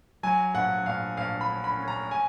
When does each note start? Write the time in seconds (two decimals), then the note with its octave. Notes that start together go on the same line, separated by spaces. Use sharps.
0.23 F#3 G#5
0.54 A#1 F#5
0.86 A#1 F5
1.17 A#1 F5
1.41 B5
1.49 C#4
1.64 B5
1.80 C#4
1.88 A#5
2.11 G#5